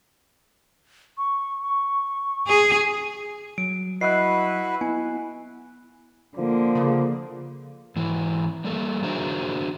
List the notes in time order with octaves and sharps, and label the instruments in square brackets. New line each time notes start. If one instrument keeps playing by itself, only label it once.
[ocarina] C#6
C#6
[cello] G#4
[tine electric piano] F#3 [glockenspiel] D7
[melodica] E4 F#4 B4 [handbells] D#5 E5 [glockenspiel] F#6 C7
[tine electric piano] B3 E4 [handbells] G#5
[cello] D3 A#3 [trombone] F3
[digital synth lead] C#3
[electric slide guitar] G#2 E3
G3 A3 A#3 A4
D4 F#4 G#4 A#4 C5 E5